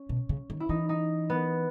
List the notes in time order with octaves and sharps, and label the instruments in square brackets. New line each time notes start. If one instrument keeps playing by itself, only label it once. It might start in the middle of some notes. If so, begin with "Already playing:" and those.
Already playing: [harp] C#4
[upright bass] B2
C#3
D#3
[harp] E4
[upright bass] E3 [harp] D#4
[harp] D#4
B3